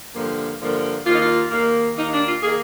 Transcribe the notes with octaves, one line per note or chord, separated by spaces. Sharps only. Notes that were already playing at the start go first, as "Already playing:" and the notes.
G2 D3 F3 A#3
G2 D3 F3 A#3
D#2 D#3 A#3 F4
D#4
F4
D#2 D#3 A#3
D#2 D#3 A#3 D#4
D4
F4
D#3 A#3 G#4